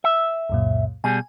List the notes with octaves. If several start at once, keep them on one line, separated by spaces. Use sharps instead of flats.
E5
C#2 F#2 A#2
B2 G3 G#4 G#5